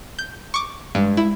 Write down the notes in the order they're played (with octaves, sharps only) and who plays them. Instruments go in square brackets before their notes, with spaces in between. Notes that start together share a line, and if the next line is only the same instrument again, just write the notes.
[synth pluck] G6
C#6 D6
[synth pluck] G2 [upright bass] G#3
[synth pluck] E4